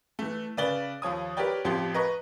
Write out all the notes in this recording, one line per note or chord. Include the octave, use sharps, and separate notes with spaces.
E3 A3
C#3 B4 D5 A6 G7
D#2 F3 C#5 D#6
G4 A#4 B4 C#5 D5 G5
A1 F2 F3 G4 G5 C6
B4 D#5 A#5 C#6